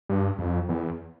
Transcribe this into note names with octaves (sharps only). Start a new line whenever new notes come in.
G2
F2
E2